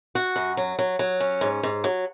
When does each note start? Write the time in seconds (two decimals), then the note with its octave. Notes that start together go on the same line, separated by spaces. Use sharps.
0.15 F#4
0.36 F#2
0.57 F#3
0.79 F#3
0.99 F#3
1.20 C#4
1.41 G#2
1.63 G#2
1.84 F#3